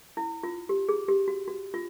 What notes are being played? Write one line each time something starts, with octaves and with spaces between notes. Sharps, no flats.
E4
F4
G4
G#4
G4
F#4
F#4
F4